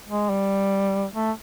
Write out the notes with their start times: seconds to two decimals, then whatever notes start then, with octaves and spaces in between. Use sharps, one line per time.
0.09 G#3
0.30 G3
1.14 A3